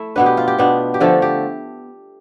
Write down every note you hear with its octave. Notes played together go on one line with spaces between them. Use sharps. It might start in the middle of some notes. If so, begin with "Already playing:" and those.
Already playing: A3 E4 E5
B2 B3 D4 B4
G4
F4
G4
B2 B3 D4
G4
D3 F3 A3 A4
G4